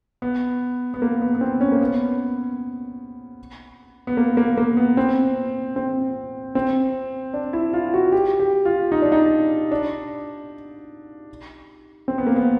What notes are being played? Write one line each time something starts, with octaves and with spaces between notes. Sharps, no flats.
B3
B3
A#3
B3
B3
C4
C#4
A#3
B3
B3
A#3
A#3
A#3
B3
C4
C4
C4
D4
E4
F4
F#4
G4
G4
F4
D#4
D4
D#4
D4
C4
B3
A#3
B3